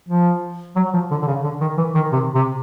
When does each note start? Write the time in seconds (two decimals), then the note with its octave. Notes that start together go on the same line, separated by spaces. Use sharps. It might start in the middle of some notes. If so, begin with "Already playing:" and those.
0.09 F3
0.76 F#3
0.94 F3
1.11 D3
1.22 D3
1.27 C#3
1.44 D3
1.61 D#3
1.77 E3
1.95 D#3
2.12 C3
2.35 C3